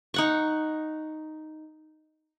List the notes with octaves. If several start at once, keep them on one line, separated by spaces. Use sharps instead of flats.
D#4 F#5 C#6